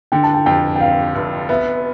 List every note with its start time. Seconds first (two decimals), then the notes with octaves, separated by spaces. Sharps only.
0.12 D3 G5
0.23 A5
0.34 G5
0.46 F2 G5
0.76 G5
0.80 F1 F5
1.15 F1
1.49 B3 E5